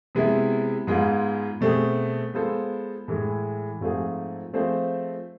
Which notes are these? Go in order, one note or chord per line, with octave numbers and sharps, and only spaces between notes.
C3 G#3 B3 E4
G#2 G#3 B3 F4
B2 A3 C4 G#4
G#3 B3 F4 A4 C5
A2 E3 G#3
G#2 F3 A3 C4 G#4
F3 A3 C4 G#4 C5